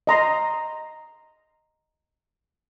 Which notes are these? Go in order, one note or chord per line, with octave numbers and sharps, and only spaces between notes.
D#5 A#5 C6